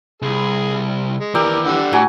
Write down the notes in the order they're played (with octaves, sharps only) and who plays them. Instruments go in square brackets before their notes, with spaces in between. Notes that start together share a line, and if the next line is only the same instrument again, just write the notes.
[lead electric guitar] C2 [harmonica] G#4
[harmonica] G#3
[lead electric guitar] D#2 E3 [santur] G4 D6 E6 [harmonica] A#4 D5
[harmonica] D3 G3 F#5
[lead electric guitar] A2 [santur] F#4 G#5 A#5